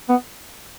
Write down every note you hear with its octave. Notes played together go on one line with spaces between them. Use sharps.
B3